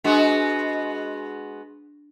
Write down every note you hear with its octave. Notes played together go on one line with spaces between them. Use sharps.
G#3 B3 D4 F#4